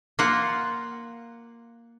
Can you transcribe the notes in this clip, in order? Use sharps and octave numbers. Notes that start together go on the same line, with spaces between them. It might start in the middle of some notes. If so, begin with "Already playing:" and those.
A#3 F4 F#5